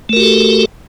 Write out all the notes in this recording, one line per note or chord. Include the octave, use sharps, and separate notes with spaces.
A3 F#4 G4 A4 A#4